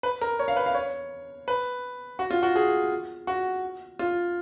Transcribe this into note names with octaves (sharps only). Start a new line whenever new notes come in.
B4
A#4
C#5
F5
B4
F5
C#5
B4
F#4
F4
F#4
G#4
F#4
F4